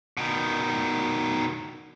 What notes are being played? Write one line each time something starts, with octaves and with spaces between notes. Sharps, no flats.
B2 D#3